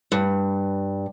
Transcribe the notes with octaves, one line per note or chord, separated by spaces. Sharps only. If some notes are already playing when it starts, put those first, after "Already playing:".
G2